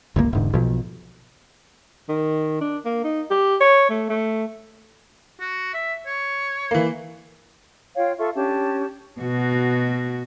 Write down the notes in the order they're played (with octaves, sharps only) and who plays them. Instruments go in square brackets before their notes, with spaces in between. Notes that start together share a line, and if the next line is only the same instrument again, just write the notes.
[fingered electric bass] G1 C#2 A#2 A#3
E1 G#2 D3
B1 B2 F3
[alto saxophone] D#3
D4
A#3
D#4
G4
C#5
A3
A3
[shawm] F#4
E5
C#5
[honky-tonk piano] E3 A#3
[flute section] F4 C#5 F5 G5
F4 A4 E5 C#6
C#4 D4 G4 A5
[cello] B2 F#4